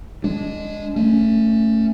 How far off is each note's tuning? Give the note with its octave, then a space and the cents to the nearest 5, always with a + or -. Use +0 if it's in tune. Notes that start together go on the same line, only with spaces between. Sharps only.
G#3 +0 D4 -20
A3 +15 C#4 +5